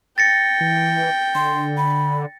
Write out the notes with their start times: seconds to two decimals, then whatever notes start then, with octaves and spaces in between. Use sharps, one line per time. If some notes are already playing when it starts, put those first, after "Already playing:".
0.18 G5 A6 A#6 C#7
0.61 E3
1.35 D3 C6
1.77 D3 B5